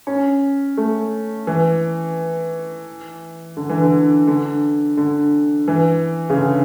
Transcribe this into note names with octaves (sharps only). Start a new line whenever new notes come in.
C#4
A3
E3
D3
E3
D3
D3
D3
E3
C#3
D3